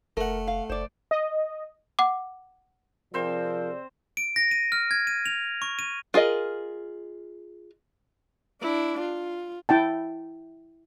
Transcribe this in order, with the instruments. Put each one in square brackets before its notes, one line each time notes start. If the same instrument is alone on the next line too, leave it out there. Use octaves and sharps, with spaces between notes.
[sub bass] F1 [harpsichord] A3 F#5 [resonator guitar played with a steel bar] A#4
[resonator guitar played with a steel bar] F5
[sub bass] F#1 [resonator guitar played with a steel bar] C5 D5
[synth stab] D#5
[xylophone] F#5 D6
[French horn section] C3 G#4 D5 [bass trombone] F3 [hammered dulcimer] C4 C5 [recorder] A#4
[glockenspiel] D7
A#6
D#7
F6
G#6
D#7
F7
C#6
D#7
[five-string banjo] F4 G#4 A#4 D#5
[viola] D4 E4
F4
[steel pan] E4 G5 A5